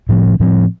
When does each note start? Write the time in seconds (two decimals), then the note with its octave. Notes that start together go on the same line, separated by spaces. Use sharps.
0.09 A2 F3 C4
0.40 A2 F3 C4